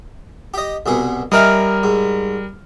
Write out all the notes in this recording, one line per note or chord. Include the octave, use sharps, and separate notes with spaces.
G4 D#5
C2 B2 G#4
G3 A#4 D#5 E5 G#5 F6
G#2